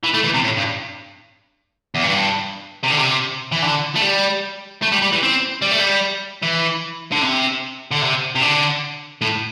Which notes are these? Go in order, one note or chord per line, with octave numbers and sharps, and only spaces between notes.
E3
A3
E3
C3
A2
G2
E2
G2
C3
D3
C3
E3
D3
A3
G3
A3
G3
G3
E3
C4
G3
A3
G3
E3
D3
C3
D3
C3
C3
D3
A2